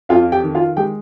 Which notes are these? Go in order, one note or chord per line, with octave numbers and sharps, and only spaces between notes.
F2 F4 F5
G4 G5
D#3
F4 F5
G#3 G4 G5